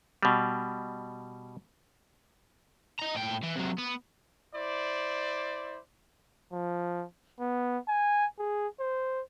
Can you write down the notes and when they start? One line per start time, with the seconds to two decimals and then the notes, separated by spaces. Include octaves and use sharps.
0.23 B2 G3
2.99 D#5 A#5
3.15 A2 G5
3.43 E3
3.56 C3 F#3
3.79 B3
4.55 E4 C5 D5
6.53 F3
7.40 B3
7.88 G#5
8.39 G#4
8.80 C5